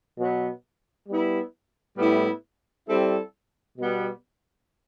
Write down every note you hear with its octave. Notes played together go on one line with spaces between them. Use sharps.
B2 F#3 B3
G3 B3 E4
A2 G3 B3 E4
G3 C4 E4 A4
B2 G3 B3